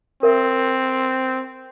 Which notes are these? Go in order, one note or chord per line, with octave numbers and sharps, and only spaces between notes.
C4 A#4 E5